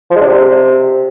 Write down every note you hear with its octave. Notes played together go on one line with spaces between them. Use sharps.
F3
G#3
D4
C3